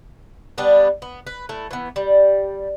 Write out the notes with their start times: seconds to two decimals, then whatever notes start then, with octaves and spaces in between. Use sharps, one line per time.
0.58 G3 B3 D4
1.02 B3
1.27 B4
1.49 A3 E4
1.71 E3 B3
1.96 G3